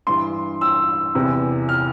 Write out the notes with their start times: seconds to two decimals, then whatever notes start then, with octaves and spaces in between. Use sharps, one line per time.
0.07 G2 E3 C6
0.61 E6
1.15 E2 C3 E3
1.69 F6